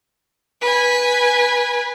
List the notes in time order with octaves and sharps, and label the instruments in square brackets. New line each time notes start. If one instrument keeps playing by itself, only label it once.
[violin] B4 G#5